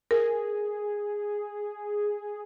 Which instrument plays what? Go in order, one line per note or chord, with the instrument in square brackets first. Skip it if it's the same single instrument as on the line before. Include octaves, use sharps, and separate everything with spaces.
[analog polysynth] G#4 [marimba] A#4